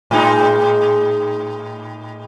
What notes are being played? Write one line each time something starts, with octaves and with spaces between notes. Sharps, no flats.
A2 G#3 D#4